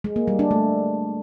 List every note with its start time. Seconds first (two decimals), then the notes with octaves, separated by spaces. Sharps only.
0.04 G#3
0.16 A#3
0.28 G3
0.39 D4
0.51 A3